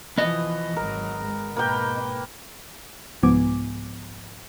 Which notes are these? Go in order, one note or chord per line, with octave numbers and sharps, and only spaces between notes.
E3 F3 B3 D#5
G#1 F#3 A#4
G#3
G#2 B2 A#3 B4 G5
C2 G#2 F3 B3 G#5 D6